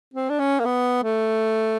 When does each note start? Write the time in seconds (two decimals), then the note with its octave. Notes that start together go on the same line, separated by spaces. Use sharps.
0.14 C4
0.29 D4
0.39 C#4
0.59 A#3
0.65 B3
1.03 A3